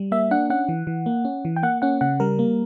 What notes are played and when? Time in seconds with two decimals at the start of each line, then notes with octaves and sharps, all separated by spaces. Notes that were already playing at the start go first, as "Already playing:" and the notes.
Already playing: G3
0.12 A#3 E5
0.31 D4 F#5
0.50 C#4 F#5
0.69 E3
0.87 E3
1.06 A#3
1.25 C#4
1.45 E3
1.56 G5
1.63 A#3 F#5
1.82 C#4 F#5
2.01 C#3 F#5
2.20 G3 A#4
2.39 A#3